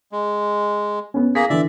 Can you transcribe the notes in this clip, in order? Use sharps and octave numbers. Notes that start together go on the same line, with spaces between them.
G#3
B3 C#4
A#3 G#4 A#6 B6
D3 E3 D5 E5